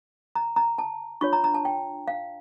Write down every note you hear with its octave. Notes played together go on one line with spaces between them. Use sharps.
A#5
A#5
A5
D4 F4 C#5 C#6
A#5
A#5
A5
G5
F5